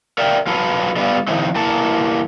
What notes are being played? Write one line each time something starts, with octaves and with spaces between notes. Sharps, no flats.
A#4 D5 E5 F5 G5
F#3 F4 A4 B4
D3 G3 B3 F4
D#3 F3 C4 D#4 E4
E3 A#3 A5